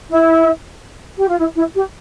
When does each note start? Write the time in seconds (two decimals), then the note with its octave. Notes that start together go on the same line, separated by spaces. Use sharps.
0.10 E4
1.18 G4
1.28 F4
1.38 E4
1.55 E4
1.74 G4